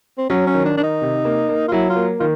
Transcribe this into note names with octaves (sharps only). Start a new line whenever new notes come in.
C4
F#3 C#4
C#4
D#3
D4
D#3 D4
D#4
C3
A#3
A#3
F4
F#3 E4
F4
A#3
D#3 F4